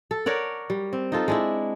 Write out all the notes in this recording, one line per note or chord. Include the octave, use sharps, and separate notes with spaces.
A4
A#4 C#5 D5 F#5
G3
C4
D#4 F4 A4
G#3 D4 E4